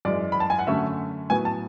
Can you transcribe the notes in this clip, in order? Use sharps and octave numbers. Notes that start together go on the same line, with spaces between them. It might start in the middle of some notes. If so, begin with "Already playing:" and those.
F#2 E3 G#3 D5
B5
A5
G#5
F#5
F#2 D3 A3 C#4 E5
A2 F#3 B3 G#5
A5